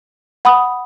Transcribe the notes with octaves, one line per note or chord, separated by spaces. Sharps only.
F#5 B5 D#6